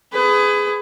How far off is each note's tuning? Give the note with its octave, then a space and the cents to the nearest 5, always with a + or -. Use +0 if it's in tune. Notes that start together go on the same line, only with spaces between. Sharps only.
G#4 +0 B4 +30